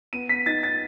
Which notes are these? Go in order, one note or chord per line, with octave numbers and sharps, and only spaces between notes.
B3 D#7
B6
D#4 A6
A6